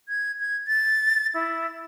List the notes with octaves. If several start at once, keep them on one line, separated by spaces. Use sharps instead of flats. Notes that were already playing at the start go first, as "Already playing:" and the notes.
G#6
G#6
A6
E4